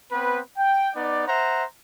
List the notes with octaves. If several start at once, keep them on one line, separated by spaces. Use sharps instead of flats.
B3 C4 B4
G5
B3 D#4 D5
C5 E5 F#5 A#5